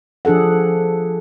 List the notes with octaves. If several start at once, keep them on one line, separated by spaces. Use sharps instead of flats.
F3 D4 G#4 A4 F#5